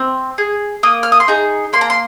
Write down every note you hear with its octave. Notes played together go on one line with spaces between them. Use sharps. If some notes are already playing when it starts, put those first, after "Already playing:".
Already playing: C4
G#4
A#3 D#6
F6
D#6
C6
D#4 G#4 A#5
A#3 C6
A#5
C6